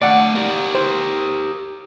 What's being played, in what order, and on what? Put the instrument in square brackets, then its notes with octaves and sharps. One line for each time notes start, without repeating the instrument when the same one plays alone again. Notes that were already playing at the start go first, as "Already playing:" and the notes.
[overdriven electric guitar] A3 F5 [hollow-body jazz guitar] D5 F#5
[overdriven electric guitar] G4 A#4
[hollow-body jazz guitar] C5